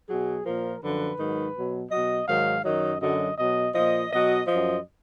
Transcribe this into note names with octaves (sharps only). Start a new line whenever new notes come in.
B2 F#3 G#4
A#2 F3 A#4
F#2 D3 F3 B4
G#2 D#3 F#3
B2 F#3
B2 F#3 D#5
G#2 D#3 F#3 F5
F#2 D#3 F#3 D#5
F#2 D3 F#3 D#5
B2 F#3 D#5
A#2 F3 D#5
B2 F#3 D#5
F3 D#5
F#2